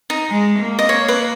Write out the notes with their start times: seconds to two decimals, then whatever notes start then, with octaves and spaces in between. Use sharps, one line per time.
0.10 D#4
0.29 G#3
0.59 A#3
0.79 D#5
0.89 C#5
1.08 B4